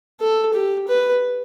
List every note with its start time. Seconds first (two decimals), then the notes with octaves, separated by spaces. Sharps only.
0.20 A4
0.54 G4
0.88 B4